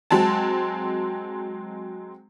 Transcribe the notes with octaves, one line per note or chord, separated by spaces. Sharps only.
F#3 G#3 C4 A5